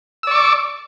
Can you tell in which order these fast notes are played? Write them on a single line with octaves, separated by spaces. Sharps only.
E6 D5 C#6 D6